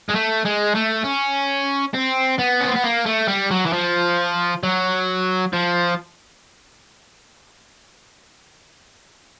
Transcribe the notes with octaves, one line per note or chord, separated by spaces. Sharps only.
G#3
A3
G#3
A3
C#4
C4
B3
C#4
C4
B3
A#3
A3
G3
F#3
E3
F3
F#3
F3